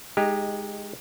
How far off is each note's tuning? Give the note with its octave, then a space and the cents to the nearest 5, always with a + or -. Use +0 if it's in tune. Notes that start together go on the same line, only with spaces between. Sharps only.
G#3 +0 D#4 -5 G4 +20